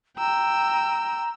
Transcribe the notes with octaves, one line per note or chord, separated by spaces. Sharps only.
G5 A#5 E6